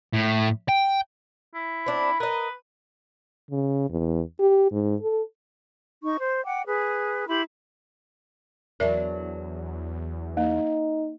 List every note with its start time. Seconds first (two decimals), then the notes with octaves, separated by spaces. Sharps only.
0.14 A2
0.69 G5
1.55 E4
1.86 C4 D4 B5
2.20 A#4 B4 D#5
3.51 C#3
3.90 E2
4.40 G4
4.72 G#2
5.02 A4
6.02 D#4 C#6
6.19 C5
6.44 F#5 G5 D6
6.66 G#4 B4
7.28 E4 G4 B5 C6
8.80 E2 F#3 D4 A#4 E5
10.37 A#3 D#4